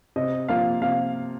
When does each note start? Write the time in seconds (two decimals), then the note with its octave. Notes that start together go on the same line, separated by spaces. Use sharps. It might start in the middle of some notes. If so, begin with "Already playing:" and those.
0.16 C3 D#5
0.49 F3 A#3 F4 F5
0.82 C3 F5